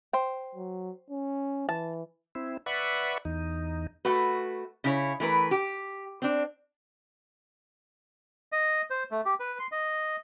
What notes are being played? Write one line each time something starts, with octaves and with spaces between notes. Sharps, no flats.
C5 G5
F#3
C#4
E3 A5
C4 E4
B4 D5 E5 F#5 B5 C#6
E2 D#4
A3 F#4 B4
C#3 E4 C#5
E3 A3 A#4 B4
G4
C4 D4
D#5
C5
A3
G4
B4
C6
D#5